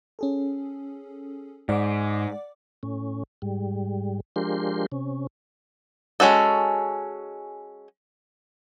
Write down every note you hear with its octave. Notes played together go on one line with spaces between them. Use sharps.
C#4 G#4 A4
G#2 D5 F#5 D6
A2 C#4
G#2 G3
F3 G#3 D4 G4 A#4 C6
C3 C#4
G#3 C#4 F#4 A4